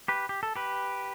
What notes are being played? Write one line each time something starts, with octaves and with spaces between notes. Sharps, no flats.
G4 B4
G4
A4
G4 B4